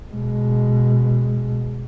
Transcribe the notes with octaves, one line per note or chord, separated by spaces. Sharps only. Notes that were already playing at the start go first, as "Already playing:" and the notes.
B2 G#3